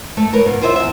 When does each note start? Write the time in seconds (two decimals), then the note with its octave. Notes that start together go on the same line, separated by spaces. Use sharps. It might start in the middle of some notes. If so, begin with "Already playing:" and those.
0.17 A3
0.33 A#4 B4 C#5
0.46 B2 D#3 A#3
0.62 F4 G#4 C5 C#5 D#5 E5
0.76 E2 E5